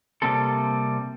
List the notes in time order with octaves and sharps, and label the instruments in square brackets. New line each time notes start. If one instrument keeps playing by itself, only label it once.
[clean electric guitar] C3 E3 G3 A#3 C4 A4